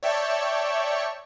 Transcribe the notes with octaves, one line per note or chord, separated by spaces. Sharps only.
C#5 D5 E5 G5 A5 C#6